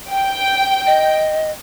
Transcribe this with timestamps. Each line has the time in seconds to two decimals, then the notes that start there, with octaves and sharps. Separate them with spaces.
0.12 G5
0.86 D#5